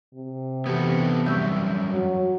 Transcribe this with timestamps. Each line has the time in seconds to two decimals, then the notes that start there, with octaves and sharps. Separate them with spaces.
0.15 C3
0.66 E3 B3 F#4 G4 A4
1.26 F#2 G3 E5 C#6 E6 G6
1.93 F#3